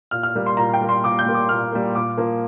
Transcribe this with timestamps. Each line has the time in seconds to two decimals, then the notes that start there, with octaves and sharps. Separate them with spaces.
0.11 A#2 F6
0.23 F6
0.35 G3 A#3
0.46 C6
0.57 A#2 A#5
0.74 G5
0.81 G3 A#3
0.89 C6
1.04 A#2 D6
1.19 G6
1.27 G3 A#3
1.34 D6
1.49 A#2 F6
1.72 G3 A#3
1.95 A#2 D6
2.17 F3 A#3